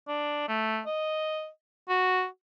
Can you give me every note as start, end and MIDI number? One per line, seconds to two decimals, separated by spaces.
0.08 0.44 62
0.48 0.80 57
0.86 1.48 75
1.89 2.25 66